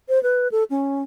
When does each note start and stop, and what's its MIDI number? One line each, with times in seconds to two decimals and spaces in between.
0.09 0.22 72
0.23 0.48 71
0.52 0.64 69
0.70 1.03 61